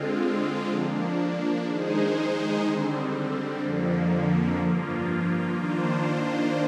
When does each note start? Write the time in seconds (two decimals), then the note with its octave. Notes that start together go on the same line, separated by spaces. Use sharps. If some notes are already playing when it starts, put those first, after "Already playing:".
Already playing: D3 G#3 C4 F4
0.68 F3 A#3 D4
1.66 D#3 G#3 D#4 G#4 C5
2.63 D3 G3 C4
3.60 F2 D3 F3 A#3
4.57 G2 F3 A#3 F4
5.54 D#3 A#3 D4 F4 C5